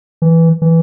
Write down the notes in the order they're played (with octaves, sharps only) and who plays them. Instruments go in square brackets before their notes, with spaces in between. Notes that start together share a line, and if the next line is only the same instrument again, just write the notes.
[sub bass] E3
E3